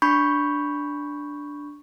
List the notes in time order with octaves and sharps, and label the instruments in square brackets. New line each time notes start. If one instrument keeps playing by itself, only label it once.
[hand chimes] D4 B5 C#6 G6